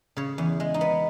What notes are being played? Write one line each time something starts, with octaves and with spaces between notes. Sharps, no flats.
C#3 C#5
E2
G#3
D#4
B3